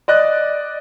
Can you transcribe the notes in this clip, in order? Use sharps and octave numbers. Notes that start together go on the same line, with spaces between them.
D5 D#5 F#6